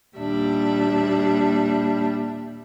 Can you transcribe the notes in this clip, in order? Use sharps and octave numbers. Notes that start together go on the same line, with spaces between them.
D#2 A#2 G3 D4 E5